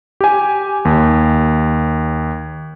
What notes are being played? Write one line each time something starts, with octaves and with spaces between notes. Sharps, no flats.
G4 G#5
D#2